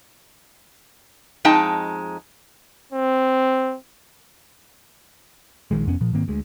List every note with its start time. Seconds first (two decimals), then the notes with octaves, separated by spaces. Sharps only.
1.45 F2 G#3 D#4 D#5 G5 A5
2.92 C4
5.71 A#1 D#3 G#3
5.86 F1 F2 B3 C#4
6.01 A#2 F3
6.13 G#2 D#3 A#3 C4
6.28 D2 G#3